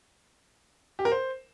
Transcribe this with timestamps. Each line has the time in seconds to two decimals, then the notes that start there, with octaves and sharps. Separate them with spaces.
0.99 G4
1.05 A#4
1.12 C5